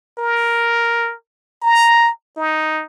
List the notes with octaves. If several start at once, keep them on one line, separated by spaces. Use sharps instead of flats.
A#4
A#5
D#4